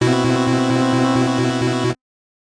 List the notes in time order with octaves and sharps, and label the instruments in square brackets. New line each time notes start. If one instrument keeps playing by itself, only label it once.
[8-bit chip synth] B2 E4 F#4 [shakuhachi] C4